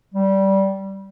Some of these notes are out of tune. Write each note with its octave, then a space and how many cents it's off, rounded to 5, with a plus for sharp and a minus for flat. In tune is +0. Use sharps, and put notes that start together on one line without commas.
G3 -15